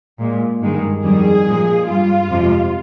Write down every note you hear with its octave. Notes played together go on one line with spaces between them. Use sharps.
A#2 G#3
G2 D#3 G#3
F2 D#3 G3 G#4
A#2 F3 G#3
G2 G3 F4
F2 C3 F3 G#3